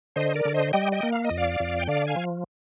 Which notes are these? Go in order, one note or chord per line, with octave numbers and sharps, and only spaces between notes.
D3 C5 D#5
A#4 D5
D3
C5 D#5
G3 D#5 G5
D#5 G5
A#3
F5
D#5
F2
D5 F5
F2
G5
D3 D5 F5
F5 G#5
F3